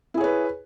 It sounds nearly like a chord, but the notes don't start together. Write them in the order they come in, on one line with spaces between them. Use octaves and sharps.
E4 G#4 C#5 B4